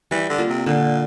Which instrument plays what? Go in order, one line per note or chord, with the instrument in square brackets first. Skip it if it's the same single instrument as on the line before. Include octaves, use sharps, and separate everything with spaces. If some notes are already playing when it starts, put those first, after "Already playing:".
[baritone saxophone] E3 [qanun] G3
[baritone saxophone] D3
[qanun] A#3 F4
[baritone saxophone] C3
[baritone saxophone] A#2 [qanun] D3